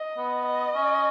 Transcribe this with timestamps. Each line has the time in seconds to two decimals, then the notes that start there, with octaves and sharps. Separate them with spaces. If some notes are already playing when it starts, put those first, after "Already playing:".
Already playing: D#5
0.17 B3
0.46 D#5
0.74 C#4